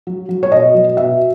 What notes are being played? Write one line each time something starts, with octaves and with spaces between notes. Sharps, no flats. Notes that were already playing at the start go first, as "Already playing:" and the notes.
F#3
F#3
C#5
B2 D#5
F#3
B2 E5